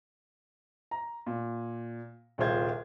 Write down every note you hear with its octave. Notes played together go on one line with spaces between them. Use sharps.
A#5
A#2
D#1 C2 F4 G#4 C5 G#6